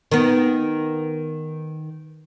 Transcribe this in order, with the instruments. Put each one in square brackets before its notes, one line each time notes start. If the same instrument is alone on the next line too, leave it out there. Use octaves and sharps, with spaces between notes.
[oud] D#3 B3